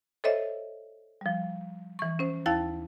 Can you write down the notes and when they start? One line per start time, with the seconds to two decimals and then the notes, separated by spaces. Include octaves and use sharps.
0.24 A4 C5 C#5 D#5 E5
1.21 F3 G3
1.99 E3 C#6
2.19 C#4 C5
2.46 D#2 E4 F5 A5 A6